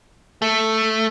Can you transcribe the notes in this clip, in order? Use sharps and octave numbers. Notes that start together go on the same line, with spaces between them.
A3